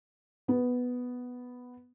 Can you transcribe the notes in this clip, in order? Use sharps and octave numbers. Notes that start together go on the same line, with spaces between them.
B3